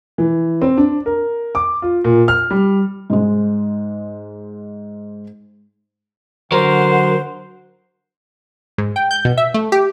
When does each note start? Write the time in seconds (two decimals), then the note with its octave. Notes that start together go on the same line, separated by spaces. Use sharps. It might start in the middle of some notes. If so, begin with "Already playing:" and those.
0.18 E3
0.62 C4
0.77 D4
1.06 A#4
1.55 D6
1.82 F4
2.04 A#2
2.28 F6
2.51 G3
3.10 G#2 G#3
6.52 D3 F#3 A#4 C5 F#5
8.78 G#2
8.96 G5
9.11 G6
9.25 B2
9.38 E5
9.54 A3
9.72 G4